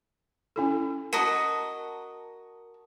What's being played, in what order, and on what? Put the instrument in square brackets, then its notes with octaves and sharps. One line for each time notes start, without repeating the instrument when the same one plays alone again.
[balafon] C#4 E4 A4
[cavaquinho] F#4 D#5 [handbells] A#4 A5 A#5